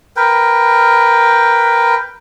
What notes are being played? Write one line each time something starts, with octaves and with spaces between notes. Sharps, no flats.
A#4 B4 G5